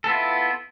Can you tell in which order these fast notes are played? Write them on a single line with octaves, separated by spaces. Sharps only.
A4 B3 F4 E4